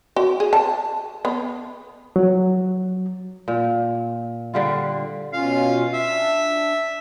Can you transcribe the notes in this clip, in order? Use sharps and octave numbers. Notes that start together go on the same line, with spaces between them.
F#4
G#4
A5
B3
F#3
A#2
D3 G3 F4
B2 C#4 F4 F5
E5
D4